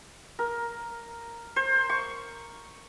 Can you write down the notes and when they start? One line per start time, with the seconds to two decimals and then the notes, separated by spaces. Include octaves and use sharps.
0.39 A#4
1.56 C5
1.89 C#6